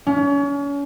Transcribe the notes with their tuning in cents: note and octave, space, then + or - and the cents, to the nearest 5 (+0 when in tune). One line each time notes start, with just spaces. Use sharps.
C#4 +35